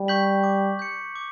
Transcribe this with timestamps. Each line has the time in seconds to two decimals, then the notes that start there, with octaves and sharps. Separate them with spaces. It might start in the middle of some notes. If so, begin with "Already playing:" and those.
Already playing: G3
0.08 C#6 G6 B6 F#7
0.44 D6
0.79 G6 C#7
1.16 D6